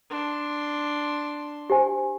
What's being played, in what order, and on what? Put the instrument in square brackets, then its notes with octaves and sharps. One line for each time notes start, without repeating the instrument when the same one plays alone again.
[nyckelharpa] D4 C6
[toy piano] G4 C5 G#5